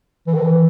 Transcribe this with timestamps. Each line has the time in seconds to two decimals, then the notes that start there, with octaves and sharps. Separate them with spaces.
0.27 E3
0.34 D#3
0.42 E3